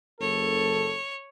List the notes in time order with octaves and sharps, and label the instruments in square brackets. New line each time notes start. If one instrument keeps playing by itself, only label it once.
[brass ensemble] F#1 A4 [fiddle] C#5